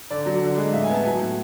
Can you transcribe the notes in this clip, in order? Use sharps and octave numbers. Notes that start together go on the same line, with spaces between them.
D3 D5
F#3
D3
G#3
A2 E5
G#5
B3 A5
F#3 G#5
A2